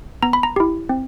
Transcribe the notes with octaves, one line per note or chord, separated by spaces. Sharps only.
B3 A#5
B5
A#5
E4 G4
C4